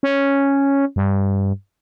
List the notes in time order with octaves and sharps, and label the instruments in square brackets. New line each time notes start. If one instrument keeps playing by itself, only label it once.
[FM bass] C#4
G2